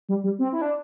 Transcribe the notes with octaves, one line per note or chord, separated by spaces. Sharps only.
G3
G3
C4
E4
D4